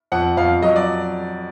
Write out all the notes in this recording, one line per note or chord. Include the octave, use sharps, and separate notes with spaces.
F2 F#5
F2 F5
F#3 D#5
D5